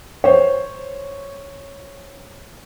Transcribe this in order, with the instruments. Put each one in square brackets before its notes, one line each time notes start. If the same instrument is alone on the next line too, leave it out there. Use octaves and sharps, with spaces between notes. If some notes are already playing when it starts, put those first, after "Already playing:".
[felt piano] C5 C#5